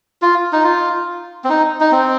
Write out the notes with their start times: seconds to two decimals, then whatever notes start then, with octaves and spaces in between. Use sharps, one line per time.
0.22 F4
0.53 D#4
0.64 F4
1.44 C4
1.50 D#4
1.81 D#4
1.92 C4